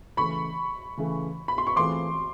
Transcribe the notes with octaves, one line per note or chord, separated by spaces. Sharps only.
C#3 E3 A3 B5 C#6
C#3 E3 A3
B5
C6
C#6
E3 A3 C4 F4 G#4 C6 D6